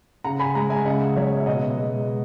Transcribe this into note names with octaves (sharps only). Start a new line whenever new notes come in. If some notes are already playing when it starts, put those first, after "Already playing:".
C#3 F#5 A#5
G#5 B5
G#3 F#5 A#5
E5 G#5
C#3 D#5 F#5
F#3 C#5 E5
E5
B2 D#5 F#5
G#3